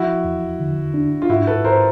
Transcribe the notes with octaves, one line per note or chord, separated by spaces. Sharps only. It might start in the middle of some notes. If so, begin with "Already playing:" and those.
Already playing: F3 E4 F#4
E2
D3
D4
F4
G#2 E4 F#4
A4 B4
G#2 A#4 C5